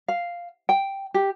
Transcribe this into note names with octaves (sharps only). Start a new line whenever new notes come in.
F5
G5
G4